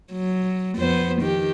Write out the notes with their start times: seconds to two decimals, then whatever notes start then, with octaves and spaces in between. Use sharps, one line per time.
0.13 F#3
0.76 F2 B3 C5
1.22 D#3 G4